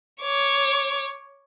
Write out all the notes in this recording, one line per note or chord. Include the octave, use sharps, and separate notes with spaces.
C#5 D6